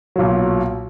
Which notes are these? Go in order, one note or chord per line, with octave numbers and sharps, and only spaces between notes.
B1 A#2 F#3